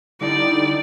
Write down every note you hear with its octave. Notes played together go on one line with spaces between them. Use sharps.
D3 G3 D#4 E4 D5